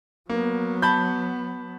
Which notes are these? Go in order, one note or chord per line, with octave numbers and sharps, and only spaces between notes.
F#3 A#3 B3
A5 B5 G6